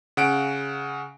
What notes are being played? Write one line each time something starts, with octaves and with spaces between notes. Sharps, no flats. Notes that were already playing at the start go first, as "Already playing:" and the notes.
C#3 F#5 D7